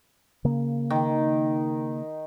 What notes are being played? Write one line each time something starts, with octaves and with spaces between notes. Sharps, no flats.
C#3 A#3
D#3